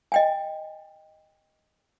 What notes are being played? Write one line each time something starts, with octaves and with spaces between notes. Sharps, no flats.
D#5 G5 G#5